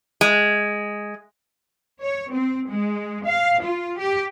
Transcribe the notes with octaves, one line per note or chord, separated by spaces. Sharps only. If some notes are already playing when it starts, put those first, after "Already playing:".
G#3
C#5
C4
G#3
F5
F4
G4